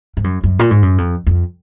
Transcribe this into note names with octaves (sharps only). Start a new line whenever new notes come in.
G#2
F#2
F#2
A#2
G#2
F#2
F2
F2